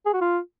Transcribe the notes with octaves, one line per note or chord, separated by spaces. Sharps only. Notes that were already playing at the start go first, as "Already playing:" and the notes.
G#4
F#4
F4